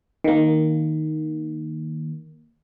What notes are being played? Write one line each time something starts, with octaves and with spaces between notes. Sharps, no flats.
D#3 A#3